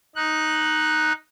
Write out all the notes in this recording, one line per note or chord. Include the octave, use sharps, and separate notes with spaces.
D#4 F#6